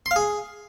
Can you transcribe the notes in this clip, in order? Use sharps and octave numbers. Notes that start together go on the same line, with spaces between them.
C6
F5
G#4